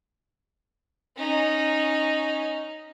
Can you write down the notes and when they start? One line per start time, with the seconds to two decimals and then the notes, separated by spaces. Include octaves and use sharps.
1.17 C#4 D#4